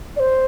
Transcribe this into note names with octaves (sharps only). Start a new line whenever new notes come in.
D5
C5